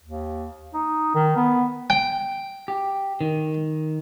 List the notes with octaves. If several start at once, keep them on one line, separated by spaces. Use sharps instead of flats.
D#2
D#4
D#3
B3
G5
G4
D#3